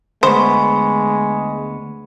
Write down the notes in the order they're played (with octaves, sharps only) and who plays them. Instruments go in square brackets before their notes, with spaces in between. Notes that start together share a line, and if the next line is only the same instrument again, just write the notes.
[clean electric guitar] D2 B3 [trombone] G#3 [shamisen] C5 [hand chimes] B5 C#6